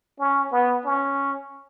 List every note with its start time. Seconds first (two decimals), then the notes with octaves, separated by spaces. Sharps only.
0.19 C#4
0.52 B3
0.85 C#4